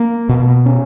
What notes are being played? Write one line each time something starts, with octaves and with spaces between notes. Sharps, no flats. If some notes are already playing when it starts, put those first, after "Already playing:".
Already playing: A#3
B2
C#4